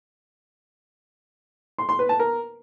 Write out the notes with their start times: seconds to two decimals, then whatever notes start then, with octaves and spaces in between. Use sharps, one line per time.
1.78 C6
1.89 C6
1.99 B4
2.09 A5
2.19 A#4